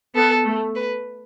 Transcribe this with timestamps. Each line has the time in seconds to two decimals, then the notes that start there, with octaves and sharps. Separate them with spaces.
0.15 B3 A4
0.45 A3
0.76 B4